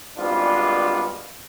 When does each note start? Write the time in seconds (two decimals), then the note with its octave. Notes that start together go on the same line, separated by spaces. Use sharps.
0.17 G#1 G#2 G3 B3 D4 F4